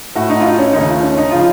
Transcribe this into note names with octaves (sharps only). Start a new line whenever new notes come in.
A2 A3 F#4
D#4
F4
D#4
C#4
D#2 C#3 A3 D#4
F4
C#4
D#4
C#3 F3 F4